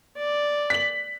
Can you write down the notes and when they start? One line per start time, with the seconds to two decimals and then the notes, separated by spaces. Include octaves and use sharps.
0.17 D5
0.70 B6 F#7